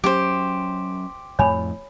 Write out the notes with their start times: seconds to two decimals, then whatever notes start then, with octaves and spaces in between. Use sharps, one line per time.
0.04 F#3 C#4 G4 C5
1.39 F2 A2 C#5 G#5 B5